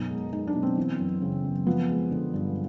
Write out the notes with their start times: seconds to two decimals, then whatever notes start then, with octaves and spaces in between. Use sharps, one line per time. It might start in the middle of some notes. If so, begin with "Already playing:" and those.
Already playing: F#2 B2 D#4
0.10 G#3
0.32 G#3 D#4
0.47 D4
0.55 B2
0.63 C4
0.77 E3
0.99 F#2
1.22 C#3
1.44 F#2
1.67 F3 B3
1.89 G#3
2.11 D3
2.34 G2